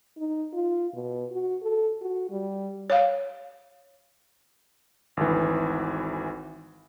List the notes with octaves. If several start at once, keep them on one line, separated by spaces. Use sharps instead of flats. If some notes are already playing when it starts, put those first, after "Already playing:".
D#4
F4
B2
F#4
A4
F#4
G3
C#5 F5
G#1 D2 E3